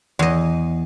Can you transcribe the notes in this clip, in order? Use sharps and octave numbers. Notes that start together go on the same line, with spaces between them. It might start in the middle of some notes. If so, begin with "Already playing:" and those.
E2 D#5